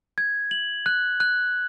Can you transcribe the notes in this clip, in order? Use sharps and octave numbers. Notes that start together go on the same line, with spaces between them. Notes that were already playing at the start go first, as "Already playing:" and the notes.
G#6
F#7
F#6
F#6